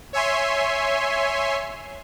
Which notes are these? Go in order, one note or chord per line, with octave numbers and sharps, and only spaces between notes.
C#5 E5 G#5 C6